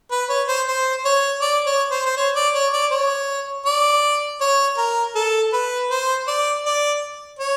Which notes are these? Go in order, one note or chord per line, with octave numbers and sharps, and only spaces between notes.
B4
C#5
C5
C5
C#5
D5
C#5
C5
C5
C#5
D5
C#5
D5
C#5
D5
C#5
A#4
A4
B4
C5
D5
D5
C#5